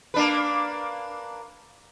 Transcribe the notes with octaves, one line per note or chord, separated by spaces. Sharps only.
A#3 D4 B4